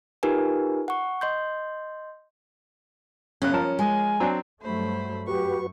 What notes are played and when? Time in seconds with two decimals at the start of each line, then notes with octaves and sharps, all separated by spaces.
0.23 D#4 F4 G4 A#4 B4 G#5
0.88 F#5 C#6
1.21 D#5 C6 G6
3.42 F#2 C#3 C#4 F#6
3.53 F3 A#4 A5
3.79 G#3 G#5
4.20 F#3 C4 D4
4.62 G2 F#3 A3 C5 B5
5.27 F#2 F#4 G4 B4 C#6